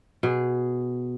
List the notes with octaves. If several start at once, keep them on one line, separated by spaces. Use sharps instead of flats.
B2 G#4